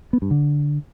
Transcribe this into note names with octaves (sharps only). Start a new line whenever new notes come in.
B3
G2
D3